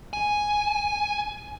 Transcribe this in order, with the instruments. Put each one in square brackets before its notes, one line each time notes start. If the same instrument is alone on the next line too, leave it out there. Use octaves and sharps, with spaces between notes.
[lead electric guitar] G#5